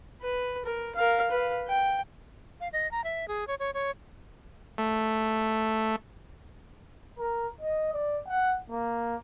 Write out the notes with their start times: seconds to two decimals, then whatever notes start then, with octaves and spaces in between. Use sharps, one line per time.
0.22 B4
0.65 A#4
0.95 A#4 F5
1.31 B4 F5
1.68 G5
2.61 F5
2.73 D#5
2.91 A#5
3.04 E5
3.28 G#4
3.47 C#5
3.60 C#5
3.74 C#5
4.78 A3
7.19 A#4
7.61 D#5
7.93 D5
8.28 F#5
8.70 A#3